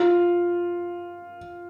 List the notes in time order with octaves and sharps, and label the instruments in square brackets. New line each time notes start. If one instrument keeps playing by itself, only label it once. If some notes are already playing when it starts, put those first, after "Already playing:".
Already playing: [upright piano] F4